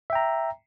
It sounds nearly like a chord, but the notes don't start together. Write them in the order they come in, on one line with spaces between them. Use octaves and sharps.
E5 G5 A#5